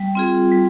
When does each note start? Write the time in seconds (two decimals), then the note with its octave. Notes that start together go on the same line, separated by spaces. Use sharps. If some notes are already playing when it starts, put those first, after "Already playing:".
Already playing: G3
0.15 C4 F4 G#4
0.52 G3